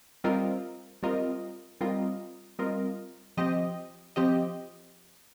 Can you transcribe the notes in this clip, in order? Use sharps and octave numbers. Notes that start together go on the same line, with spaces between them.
G3 C4 F4 A#4 D#5
G3 C4 F4 A#4 D#5
G3 C4 F4 A#4 D#5
G3 C4 F4 A#4 D#5
F3 C4 G4 D#5
F3 C4 G4 D#5